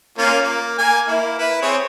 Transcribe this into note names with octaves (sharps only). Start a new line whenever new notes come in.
A#3 C#4 F4
A#3
A#3 G#5
A#3 E4
E4 B4
C4 G#4 C#5